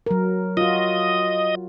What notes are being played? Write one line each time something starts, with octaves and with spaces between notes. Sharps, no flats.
F#3 A#4
F4 F#4 D#5